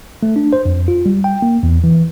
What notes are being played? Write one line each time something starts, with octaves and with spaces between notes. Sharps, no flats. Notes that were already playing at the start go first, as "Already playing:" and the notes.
A3
D4
C5
F2
F4
G3
G5
A#3
E2
E3